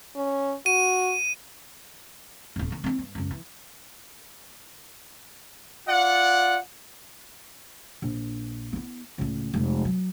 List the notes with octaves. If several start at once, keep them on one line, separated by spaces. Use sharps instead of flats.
C#4
F#4 D#7
D#1 E2
D#3 C4
C4 D4
G2
C#2 F#2
E3
F4 D5 F#5
A#1
B3 E4
C#2 A2
F1 G#3
F#3